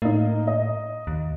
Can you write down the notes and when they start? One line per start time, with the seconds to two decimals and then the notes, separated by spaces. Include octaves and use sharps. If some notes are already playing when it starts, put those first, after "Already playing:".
0.02 A2 A#3 D#4
0.47 D#5
1.07 D#2